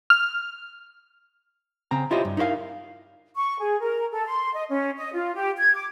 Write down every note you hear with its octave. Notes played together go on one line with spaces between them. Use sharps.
F6
C#3 C4 A#5
E4 F4 G4 C5 C#5 D#5
G2
D#4 E4 A#4 C5 F5
C#6
G#4
A#4
A4
C6
D#5
C#4
D#5
F4
G4
G#6
D6